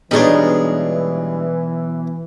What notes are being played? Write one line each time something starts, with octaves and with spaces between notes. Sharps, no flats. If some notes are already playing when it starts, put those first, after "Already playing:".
B1 E3 G3 G#3 B3 D4 D#4 C#5